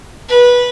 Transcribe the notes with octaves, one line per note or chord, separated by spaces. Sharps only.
B4